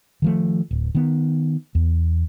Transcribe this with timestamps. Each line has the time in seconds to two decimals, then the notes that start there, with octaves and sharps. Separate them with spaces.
0.22 D#3 F3 A3
0.71 D1
0.95 D#3 B3
1.75 E2